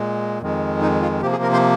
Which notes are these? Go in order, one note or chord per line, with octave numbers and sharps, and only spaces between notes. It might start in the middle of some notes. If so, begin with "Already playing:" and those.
Already playing: A#2 G#3
F2 D#3 G#3
D#4
F4
C3 F3 A#3 G4
G#4
A#4
C5